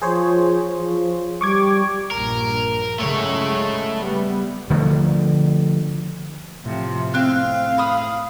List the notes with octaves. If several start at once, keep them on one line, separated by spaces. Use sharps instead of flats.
F3 G#4 C5 C#5
F3
G3 C#6 D6 G#6
A#1 G2 A#2 A#4
C#3 F#3 G#3 A3 C#5
G3 B3
D3 F3 A3
A2 C3 F3
C4 F5 F#6
B5 D#6